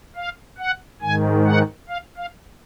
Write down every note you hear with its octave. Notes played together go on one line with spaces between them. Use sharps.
F5
F#5
G#2 D#3 G#5
F#5
F5
F5